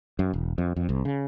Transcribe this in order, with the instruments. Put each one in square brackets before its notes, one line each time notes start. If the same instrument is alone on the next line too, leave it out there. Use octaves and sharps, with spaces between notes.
[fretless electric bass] F#2
E1
F2
F2
C2
C#3